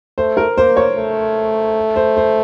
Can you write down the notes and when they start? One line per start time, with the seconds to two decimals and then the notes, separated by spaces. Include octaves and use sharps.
0.18 A3 C5
0.37 A#4
0.58 A#3 C5
0.77 C#5
0.97 A3
1.96 C5
2.17 C5